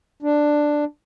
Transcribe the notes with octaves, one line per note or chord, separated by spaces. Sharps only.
D4